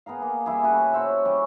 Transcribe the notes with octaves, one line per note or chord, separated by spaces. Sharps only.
B3 G#4 A#4 F5
A#3
G3 E4 G#4
C#3 F#4 A4 B4
C5 C#5 E5 F#5
G3 C#4 C#6